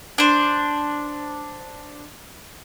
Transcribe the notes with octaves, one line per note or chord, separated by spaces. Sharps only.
D4 C5